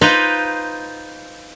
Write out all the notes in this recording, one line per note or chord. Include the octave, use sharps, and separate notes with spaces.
D#4 F4 B4 C5